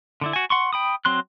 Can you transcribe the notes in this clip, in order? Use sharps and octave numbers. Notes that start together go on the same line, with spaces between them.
D3 D4 E4
F#4 G#5
F#5 C6 C#6
G5 B5 D#6
F#3 C4 C6 F#6